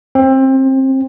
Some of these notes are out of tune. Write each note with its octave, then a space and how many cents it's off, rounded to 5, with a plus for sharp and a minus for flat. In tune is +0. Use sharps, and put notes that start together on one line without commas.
C4 +25